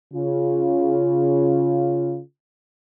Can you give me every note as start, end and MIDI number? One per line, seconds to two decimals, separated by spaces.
0.14 2.19 49
0.14 2.19 65